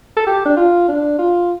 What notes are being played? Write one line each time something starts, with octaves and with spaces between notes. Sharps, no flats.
A4
G4
D4
F4
D4
F4